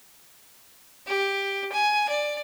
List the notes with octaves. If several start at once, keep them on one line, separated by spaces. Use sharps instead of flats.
G4
G#5
D5